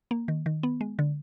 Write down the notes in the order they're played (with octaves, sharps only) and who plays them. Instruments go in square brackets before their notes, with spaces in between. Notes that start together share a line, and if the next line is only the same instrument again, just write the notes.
[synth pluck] A#3
D#3
D#3
B3
G#3
D3